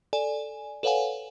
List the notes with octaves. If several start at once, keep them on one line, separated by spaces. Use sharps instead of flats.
A4 D5 G#5
A4 B4 C#5 F5 F#5 G#5